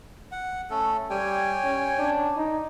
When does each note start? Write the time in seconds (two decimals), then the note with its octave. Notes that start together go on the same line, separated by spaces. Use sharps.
0.32 F#5
0.70 A3 C#4 A4
1.10 G3 C#5 G5 G#5
1.64 C#4
1.99 D4
2.36 D#4